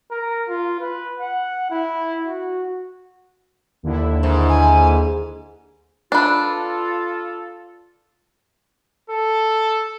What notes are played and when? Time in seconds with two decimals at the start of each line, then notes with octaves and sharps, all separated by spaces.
0.11 A#4
0.49 F4
0.80 B4
1.20 F#5
1.71 E4
2.26 F#4
3.83 D#2 D3 E4
4.23 G#2
4.49 G#5
6.12 D4 F4 A4 B4
9.10 A4